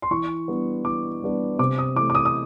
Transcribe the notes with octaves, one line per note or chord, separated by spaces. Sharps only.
C6
E3 C#6
G3 B3 D4
E3 D6
G3 B3 D4
C3 D6
D#6
E3 A3 D6
D6
D#6
D#6